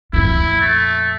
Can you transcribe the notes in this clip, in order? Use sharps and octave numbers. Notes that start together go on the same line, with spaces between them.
F2 A#2 E4
A3